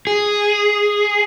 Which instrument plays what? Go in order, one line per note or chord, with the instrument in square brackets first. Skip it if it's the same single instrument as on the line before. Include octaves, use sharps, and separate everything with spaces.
[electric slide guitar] G#4